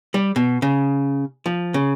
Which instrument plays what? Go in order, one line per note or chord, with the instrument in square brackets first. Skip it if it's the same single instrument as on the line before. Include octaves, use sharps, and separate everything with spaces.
[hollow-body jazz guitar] G3
B2
C#3
F3
C#3